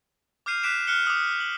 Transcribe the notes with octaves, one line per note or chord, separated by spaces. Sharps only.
D6 F6 G6 C7 D#7 F7
D6 F#6 B6 D7 E7
F6 F#6 C#7 G7
D6 D#6
F#7